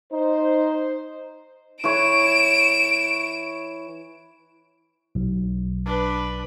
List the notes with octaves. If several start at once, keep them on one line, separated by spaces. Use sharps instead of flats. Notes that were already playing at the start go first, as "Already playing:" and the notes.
D#4 C5
E3 C#5 D7 E7
B1
D4 B4